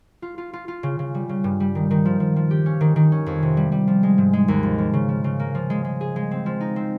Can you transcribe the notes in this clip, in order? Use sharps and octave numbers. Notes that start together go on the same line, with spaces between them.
F4
F4
F4
F4
C#3
C#3
G3
C#3
G2
G3
D#3
D#3
F3
F3
F3
G4
C#4
D#3
D#3
C#4
F2
C3
G3
G3
F3
G#3
G#2
G#3
D#2
F3
F3
C#3
F3
C#3
A#3
F3
G#3
G#3
G#4
G#3
C4
F3
D#4
C4